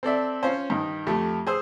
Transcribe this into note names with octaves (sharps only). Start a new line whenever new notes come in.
C4 A4 D5 E5
C#4 F4 C5
G2 D#3
F2 A3 G4
G#4 C5 E6